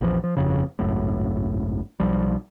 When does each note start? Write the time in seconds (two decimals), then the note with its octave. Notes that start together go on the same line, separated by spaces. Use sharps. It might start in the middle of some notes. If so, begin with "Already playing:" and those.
0.01 A#1 E2 E3 F3
0.24 F3
0.37 G1 F2 C#3
0.79 G#1 C#2 F#2 A2
2.00 B1 F3 G3